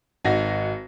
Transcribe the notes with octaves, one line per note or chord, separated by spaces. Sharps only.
G#1 D#4 F#4 A#6